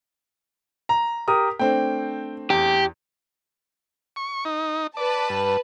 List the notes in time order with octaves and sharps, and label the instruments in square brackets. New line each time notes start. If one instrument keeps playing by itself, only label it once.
[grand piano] A#5
G4 A#4 D#6
[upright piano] A3 C4 D4 [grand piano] G5
[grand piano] E2 [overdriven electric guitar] G4
[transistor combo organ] C#6
D#4
[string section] B4 A5 [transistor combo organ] D5
[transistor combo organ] G2